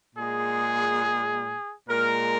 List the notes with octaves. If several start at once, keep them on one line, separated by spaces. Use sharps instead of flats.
A#2 G#3 G#4
A#2 G#3 A#4